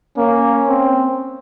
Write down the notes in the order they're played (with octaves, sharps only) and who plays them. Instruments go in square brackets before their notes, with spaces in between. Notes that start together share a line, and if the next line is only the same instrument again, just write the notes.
[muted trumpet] A#3 [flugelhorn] C#4
[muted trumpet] C4